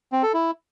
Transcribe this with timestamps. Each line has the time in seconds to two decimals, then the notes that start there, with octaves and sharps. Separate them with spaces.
0.12 C4
0.23 A4
0.34 E4